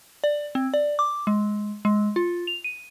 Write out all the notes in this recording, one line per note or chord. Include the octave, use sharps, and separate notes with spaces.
D5
C4
D5
D6
G#3
G#3
F4
F7
D#7